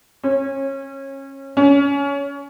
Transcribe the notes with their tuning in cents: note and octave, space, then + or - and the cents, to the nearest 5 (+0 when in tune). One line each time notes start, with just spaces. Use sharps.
C#4 -30
C#4 +20